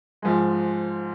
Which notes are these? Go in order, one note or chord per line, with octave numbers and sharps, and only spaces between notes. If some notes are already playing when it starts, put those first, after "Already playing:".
G#2 F3 G#3